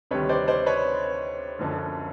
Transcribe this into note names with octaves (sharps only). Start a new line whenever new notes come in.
D2 C3 D#3 G3 B4 C#5
C5 D5
C5 D5
B4 C#5
F#1 F#2 D3 F3